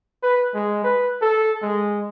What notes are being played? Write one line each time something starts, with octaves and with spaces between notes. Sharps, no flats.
B4
G#3
B4
A4
G#3